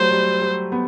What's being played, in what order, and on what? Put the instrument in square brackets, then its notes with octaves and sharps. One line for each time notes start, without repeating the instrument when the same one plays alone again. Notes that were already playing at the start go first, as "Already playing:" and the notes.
Already playing: [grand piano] F#3 G3 A3 [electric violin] C5
[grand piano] G3
G3
B3